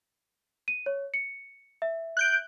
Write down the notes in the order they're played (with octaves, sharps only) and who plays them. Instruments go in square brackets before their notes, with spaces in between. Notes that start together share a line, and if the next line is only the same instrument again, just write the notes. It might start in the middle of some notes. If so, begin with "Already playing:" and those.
[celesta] D#7
C#5
C#7
E5
[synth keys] F#6 G6 D7